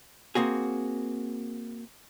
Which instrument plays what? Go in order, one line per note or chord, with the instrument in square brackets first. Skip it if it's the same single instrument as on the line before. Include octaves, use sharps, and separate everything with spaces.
[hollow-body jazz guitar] A#3 C4 F#4 G#4